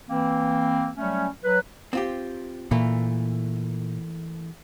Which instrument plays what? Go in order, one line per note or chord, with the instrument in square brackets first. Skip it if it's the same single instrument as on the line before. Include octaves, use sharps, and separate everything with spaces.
[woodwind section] E3 A#3 C4
F#3 G3 A3 C#4
F#3 B4
[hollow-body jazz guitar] C4 F4 G4
[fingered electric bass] A#2 [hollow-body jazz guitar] E3 A3 A#3